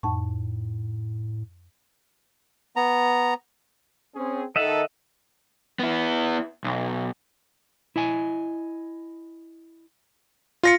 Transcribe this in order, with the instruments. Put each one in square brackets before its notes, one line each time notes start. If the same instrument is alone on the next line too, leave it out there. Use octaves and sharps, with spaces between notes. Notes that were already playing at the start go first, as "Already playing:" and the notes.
[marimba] F2 A5 C#6 [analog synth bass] A2
[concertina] B3 A#5
[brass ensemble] C4 C#4 G#4
[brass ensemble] D#3 D#4 A4 [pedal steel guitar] D#5 E5 F#5
[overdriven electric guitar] B3 E4
B1
[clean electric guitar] E4 D#5 G#5
[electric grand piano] F4 A#6 C#7